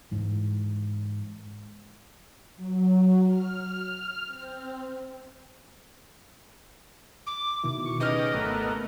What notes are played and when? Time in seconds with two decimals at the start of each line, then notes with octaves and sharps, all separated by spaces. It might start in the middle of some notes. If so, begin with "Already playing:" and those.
0.11 G#2 E3
2.56 F#3
3.25 F6
4.27 C4
7.26 D6
7.64 B2 D#3 E4
7.86 C#6
8.00 C#3 D#4 G4 B4 D#5 D6 F6
8.34 G#1 A3 B3 A#4